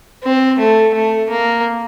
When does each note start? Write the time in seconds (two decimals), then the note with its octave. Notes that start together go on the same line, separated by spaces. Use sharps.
0.23 C4
0.59 A3
0.94 A3
1.30 A#3